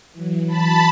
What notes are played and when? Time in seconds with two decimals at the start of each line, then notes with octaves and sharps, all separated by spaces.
0.13 E3 F#3
0.48 A5 B5